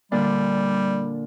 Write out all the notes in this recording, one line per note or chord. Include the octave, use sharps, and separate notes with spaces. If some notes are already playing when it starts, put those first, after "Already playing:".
A#2 D3 G3 D4